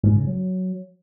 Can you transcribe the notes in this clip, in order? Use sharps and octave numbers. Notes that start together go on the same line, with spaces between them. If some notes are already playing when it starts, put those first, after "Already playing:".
G#2
C#3
F#3